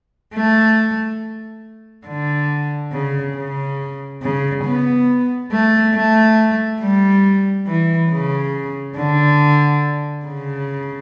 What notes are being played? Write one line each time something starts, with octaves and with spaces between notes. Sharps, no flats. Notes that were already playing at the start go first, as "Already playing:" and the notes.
A3
D3
C#3
C#3
C#3
B3
A3
A3
G3
E3
C#3
D3
C#3